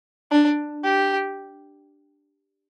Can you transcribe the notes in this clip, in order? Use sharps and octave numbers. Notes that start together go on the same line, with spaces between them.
D4
G4